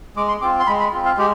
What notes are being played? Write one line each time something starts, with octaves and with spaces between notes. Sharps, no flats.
G#3 D6
C6
C4 F4 D6
C6
G#3 B5
B5
C4 F4
F5
G#3 G4